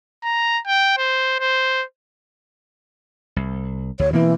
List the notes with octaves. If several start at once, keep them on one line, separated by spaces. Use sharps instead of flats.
A#5
G5
C5
C5
C2
D2 C#5
B2 E3 A#3 C4